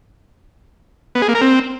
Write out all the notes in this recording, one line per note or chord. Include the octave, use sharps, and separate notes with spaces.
B3
G#4
A#3
A#4
C4